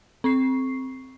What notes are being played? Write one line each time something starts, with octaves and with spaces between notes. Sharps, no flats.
C4 C#6 C7